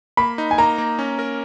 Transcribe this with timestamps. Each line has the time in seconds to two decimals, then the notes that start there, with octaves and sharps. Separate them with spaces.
0.17 A#3 B5
0.38 D#4
0.51 G#5
0.58 A#3 A#5
0.78 A#3
0.99 C#4
1.19 A#4